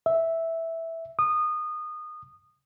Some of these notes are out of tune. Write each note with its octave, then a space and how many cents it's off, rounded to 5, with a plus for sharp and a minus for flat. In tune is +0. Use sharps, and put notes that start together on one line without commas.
E5 -5
D#6 -20